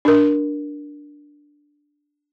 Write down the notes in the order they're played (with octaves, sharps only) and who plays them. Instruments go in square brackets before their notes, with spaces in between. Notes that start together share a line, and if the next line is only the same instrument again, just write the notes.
[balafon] D4 A#4